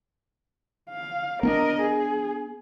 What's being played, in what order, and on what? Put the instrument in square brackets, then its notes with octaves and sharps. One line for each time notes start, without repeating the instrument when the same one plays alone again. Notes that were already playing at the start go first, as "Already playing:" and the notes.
[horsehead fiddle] F5
[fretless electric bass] B3 C#4 D4 [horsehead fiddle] A#4 D#5
[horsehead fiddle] G#4